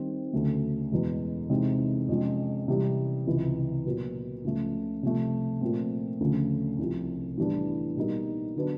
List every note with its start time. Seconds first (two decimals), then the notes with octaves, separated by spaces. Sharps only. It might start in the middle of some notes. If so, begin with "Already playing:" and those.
Already playing: D#3 G3 C4
0.33 D2 C#3 F#3 A3
0.92 E2 B2 G#3
1.50 C3 E3 G#3 C4 D#4
2.08 F2 C3 F3 G#3 C#4
2.68 C3 E3 G3 C4
3.27 C#2 C3 E3
3.86 A#2 F#3 B3
4.44 C#2 C#3 F3 A3
5.03 C3 F3 A3
5.61 A#2 F3 A3 C4
6.20 D2 C#3 F3 A3
6.78 C2 C3 F3
7.37 A2 E3 G3 B3 D4
7.97 B2 G3 A#3 D#4
8.56 D3 F#3 B3 D4